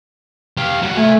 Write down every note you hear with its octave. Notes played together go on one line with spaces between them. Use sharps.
G4 F5
G3 F#4
A3 A#3 G#5